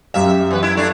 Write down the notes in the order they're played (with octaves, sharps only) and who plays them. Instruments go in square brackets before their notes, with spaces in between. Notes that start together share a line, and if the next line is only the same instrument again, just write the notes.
[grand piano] F#2 G4 F5 [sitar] E5
[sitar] E2 B4
E4
A3 D4